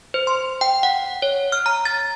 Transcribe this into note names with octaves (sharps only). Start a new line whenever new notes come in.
C5
C6
G5
F#5
C#5
F6
A#5
A6